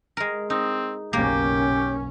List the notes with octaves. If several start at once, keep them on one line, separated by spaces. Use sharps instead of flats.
G#3 A#4
C4 D#4
F#1 B1 A#3 C#4 G4